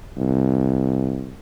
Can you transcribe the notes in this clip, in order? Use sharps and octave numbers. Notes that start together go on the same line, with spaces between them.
C2